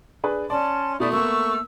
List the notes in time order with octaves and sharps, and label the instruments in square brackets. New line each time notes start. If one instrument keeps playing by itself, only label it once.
[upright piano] D4 G#4 B4
[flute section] C#4 C6 [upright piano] D5 [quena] A5
[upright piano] B2 [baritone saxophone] A3 [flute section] E4 D5 [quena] D#6
[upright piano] A#3 B3 [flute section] C#6 [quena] E6